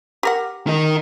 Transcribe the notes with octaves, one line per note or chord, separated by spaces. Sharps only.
G4 A#4 F#5
D#3 D#4